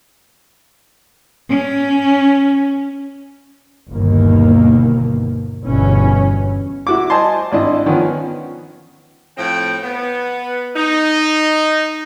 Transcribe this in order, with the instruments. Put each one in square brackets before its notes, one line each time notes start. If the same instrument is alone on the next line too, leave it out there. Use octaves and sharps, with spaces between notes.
[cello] C#4
[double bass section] G1 D#2 B2 D#3 A#3
G1 E2 B2 E3 C#4
[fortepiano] E4 F#4 D6
C5 D#5 G#5 A5 C6
G#1 D4 E4 D#5
D#3 F3 B3 C#4
[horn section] A2 F3 C4 G5
B3
D#4